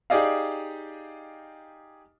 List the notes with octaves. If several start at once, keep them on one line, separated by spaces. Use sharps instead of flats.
D#4 G4 G#4 D5 D#5 F5